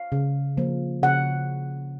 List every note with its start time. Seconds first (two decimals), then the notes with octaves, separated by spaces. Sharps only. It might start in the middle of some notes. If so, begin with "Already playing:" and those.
Already playing: F5
0.12 C#3
0.57 F3 A#3
1.03 C#3 F#5